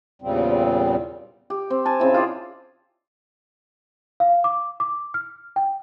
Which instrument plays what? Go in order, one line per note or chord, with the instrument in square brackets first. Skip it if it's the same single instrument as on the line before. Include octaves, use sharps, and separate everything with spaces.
[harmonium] E2 A#2 C#3 G3 C4
[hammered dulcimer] G4
C4
G#5 A5
C#3 C4 E4
D#4 F4 G#4 D5
[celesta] F5
D6
D6
F6
G5